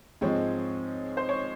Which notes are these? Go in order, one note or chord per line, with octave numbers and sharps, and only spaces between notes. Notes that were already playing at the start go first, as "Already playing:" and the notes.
G#2 F3 G#3 C4 C#5
C5
C#5